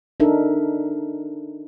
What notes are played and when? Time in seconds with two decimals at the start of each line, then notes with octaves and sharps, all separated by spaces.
0.20 D4 D#4 A4 A#4 E5